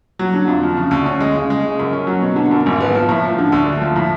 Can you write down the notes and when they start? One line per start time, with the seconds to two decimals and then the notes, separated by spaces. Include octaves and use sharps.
0.19 F#3
0.34 D3
0.48 F2
0.62 F3
0.77 C#3
0.91 D2
1.06 C#4
1.21 G#3
1.35 C#3
1.50 G#3
1.65 C#3
1.79 F#2
1.93 C#4
2.07 F#3
2.22 B2
2.36 D3
2.51 F#2
2.66 G#1
2.81 B3
2.95 F3
3.09 A2
3.24 F3
3.38 D3
3.52 D2
3.66 A3
3.81 F3
3.96 A2